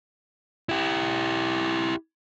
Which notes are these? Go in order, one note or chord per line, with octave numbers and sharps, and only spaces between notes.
E4 G4